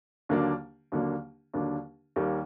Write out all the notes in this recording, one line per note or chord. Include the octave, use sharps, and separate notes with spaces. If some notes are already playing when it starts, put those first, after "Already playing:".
D#2 D3 F#3 A#3 D4
D#2 D3 F#3 A#3 D4
D#2 D3 F#3 A#3 D4
D#2 D#3 G3 A#3